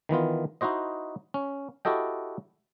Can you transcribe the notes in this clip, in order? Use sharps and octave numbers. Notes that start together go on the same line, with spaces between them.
D#3 E3 B3 F4
D#4 E4 F#4 C5 D#5
C#4
E4 F#4 G4 A4 D#5 G5